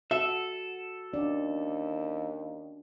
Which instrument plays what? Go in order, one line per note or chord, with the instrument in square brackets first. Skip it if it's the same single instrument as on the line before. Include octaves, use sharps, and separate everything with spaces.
[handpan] F#4 [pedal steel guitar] A4 [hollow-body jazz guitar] E5
[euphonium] D#2 [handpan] C#4 D4 D5